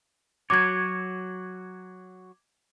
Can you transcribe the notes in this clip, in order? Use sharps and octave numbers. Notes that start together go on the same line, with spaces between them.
F#3 F#4 C#5 D6 G#6